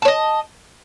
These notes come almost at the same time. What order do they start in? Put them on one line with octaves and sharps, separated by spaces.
A5 C#5 D#5